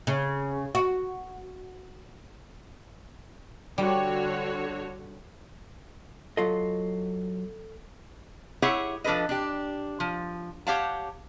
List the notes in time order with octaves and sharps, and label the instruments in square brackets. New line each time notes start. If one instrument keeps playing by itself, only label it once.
[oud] C#3
F#4
[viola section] D3 F#4 C#5 [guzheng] G3
[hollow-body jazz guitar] F#3 F4 D#5 [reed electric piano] A4
[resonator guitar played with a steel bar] E4 G4 G#4 C#5 E5 F#5
F3 D4 A4 B4 D#5
D4 G4
F3
G4 C#5 F5 F#5 A5